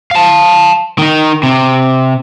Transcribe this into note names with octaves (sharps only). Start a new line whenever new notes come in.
F5 A5
D#3 D#4
C3